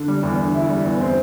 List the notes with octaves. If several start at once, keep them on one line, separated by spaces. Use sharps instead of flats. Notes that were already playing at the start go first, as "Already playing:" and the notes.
Already playing: D3
G3
E2
D3
E4
G3
E2
C4